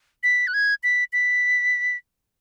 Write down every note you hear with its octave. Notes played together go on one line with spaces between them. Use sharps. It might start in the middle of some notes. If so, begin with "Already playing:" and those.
B6
F#6
G#6
B6
B6